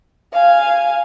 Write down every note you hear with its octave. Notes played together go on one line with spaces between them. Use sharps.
F5 G#5